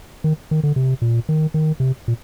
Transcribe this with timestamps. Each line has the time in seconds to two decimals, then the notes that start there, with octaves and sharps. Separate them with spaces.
0.24 D#3
0.51 D#3
0.63 D3
0.76 C3
1.02 A#2
1.29 D#3
1.54 D#3
1.80 C3
2.08 A#2